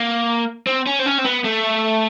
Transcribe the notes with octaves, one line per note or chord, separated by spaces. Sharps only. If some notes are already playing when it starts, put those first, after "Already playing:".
Already playing: A#3
C4
C#4
C4
C#4
C4
B3
A3